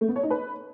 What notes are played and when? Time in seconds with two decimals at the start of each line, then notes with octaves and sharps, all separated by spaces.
0.01 A3
0.08 B3
0.16 C#5
0.23 D#4
0.30 B4